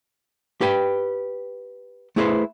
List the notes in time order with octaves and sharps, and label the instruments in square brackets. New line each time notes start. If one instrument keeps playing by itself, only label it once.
[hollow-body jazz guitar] G4 B4 G5
A3 E4 G#4 A4 B4 C5